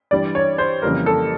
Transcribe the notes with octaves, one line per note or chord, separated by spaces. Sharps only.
G2 E3 G3 D5
C#5
C5
F2 C#3 E3 G3 A#3 A#4
A4